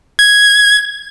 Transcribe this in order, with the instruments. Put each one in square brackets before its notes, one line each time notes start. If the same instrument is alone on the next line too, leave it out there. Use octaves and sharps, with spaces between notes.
[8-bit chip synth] G#6